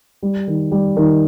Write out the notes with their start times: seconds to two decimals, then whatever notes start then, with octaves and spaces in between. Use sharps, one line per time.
0.23 G3
0.48 D#3
0.72 G3
0.97 D#3